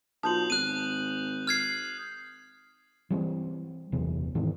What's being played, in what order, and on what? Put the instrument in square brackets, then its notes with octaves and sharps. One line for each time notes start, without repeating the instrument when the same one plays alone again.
[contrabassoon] B1 [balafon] F4 A5 [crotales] D#6 G6 F#7
[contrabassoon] G#1 [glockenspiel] F#6 D#7
[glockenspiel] F6 G#6 C7
[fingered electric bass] E3 G3 G#3 C4
F#1 E2 C3 E3
G#2 D#3 E3 C4